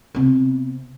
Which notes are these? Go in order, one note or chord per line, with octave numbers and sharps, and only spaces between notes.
C3 B3